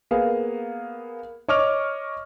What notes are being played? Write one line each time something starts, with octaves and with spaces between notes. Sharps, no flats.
A#3 B3 G#4 F5
C#5 D#5 C#6 D6 F6 F7